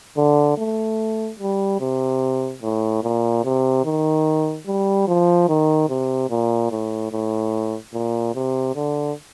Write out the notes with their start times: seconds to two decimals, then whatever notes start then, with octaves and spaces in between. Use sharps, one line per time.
0.17 D3
0.58 A3
1.40 G3
1.80 C3
2.62 A2
3.03 A#2
3.44 C3
3.85 D#3
4.67 G3
5.08 F3
5.48 D#3
5.89 C3
6.30 A#2
6.71 A2
7.12 A2
7.94 A#2
8.35 C3
8.76 D3